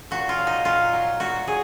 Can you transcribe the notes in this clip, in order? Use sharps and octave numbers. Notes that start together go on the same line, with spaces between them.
A#2 F#4
F4
F#3
D#4
A#2 F4
F#3
A#2 F#4
F#3 G#4